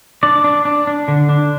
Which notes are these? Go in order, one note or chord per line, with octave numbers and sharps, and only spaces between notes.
D4 D5
D4
D4
D4
D3
D4